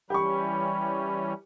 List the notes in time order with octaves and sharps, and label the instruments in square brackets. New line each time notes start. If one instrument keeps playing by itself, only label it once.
[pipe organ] E3 G3 C#4 [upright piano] G4 C#6 [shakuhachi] B5